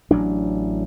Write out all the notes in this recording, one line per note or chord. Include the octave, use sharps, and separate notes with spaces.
A1 F#3 D4